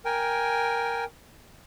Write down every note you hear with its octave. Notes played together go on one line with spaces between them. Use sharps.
A#4 G5 G#5